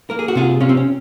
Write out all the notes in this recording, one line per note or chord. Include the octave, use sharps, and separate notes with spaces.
A#3 A#4
G#4
F#4
C3 F4 G#4
C3 C#4 F4
C4
C#4